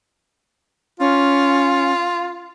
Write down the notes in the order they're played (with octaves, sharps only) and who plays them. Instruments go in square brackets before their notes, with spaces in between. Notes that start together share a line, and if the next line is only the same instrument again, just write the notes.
[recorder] C#4 [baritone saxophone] F4